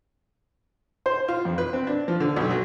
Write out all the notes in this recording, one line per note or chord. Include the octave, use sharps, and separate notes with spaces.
C5
F4
F2
B4
C4
D4
F3
D3
B1
F#3